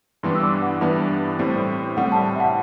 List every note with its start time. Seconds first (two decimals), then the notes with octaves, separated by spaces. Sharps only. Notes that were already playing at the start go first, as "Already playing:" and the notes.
0.23 G2 E3 G3 B3 D4 C6
0.35 E6
0.42 D6
0.62 F#5
0.81 G2 E3 G3 B3 D4 E5
1.39 A2 G3 C4
1.97 A2 G3 C4 F#5
2.12 A5
2.26 A5
2.36 E5
2.40 F#5